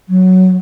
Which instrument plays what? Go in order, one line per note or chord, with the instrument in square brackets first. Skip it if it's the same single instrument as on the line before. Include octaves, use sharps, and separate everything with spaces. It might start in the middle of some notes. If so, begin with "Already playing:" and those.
[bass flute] F#3